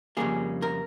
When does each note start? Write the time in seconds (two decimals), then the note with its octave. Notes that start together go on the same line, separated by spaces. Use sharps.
0.17 F2 C#3 G3 A#3 G#4
0.62 A#4